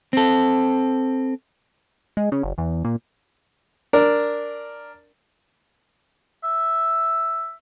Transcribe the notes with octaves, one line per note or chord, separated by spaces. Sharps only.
C4 A4
G#3
C#3
F#1
E2
A#2
D4 A#4
E5